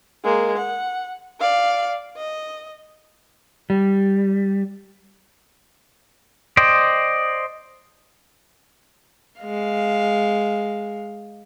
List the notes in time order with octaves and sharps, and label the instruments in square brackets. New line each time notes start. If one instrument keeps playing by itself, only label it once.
[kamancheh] G#3 A#3
F#5
D5 F5
D#5
[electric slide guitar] G3
[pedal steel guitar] C5 D5 D#5 G5
[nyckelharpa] G#3 F5